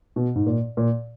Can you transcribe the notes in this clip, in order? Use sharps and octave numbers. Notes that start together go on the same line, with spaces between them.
B2
G#2
A#2
A#2